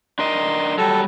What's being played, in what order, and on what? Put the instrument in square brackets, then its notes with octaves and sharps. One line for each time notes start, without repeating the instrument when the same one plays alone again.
[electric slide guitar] D4 A#4 D#5 [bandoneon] C6
[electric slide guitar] F#3 G3 [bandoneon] A4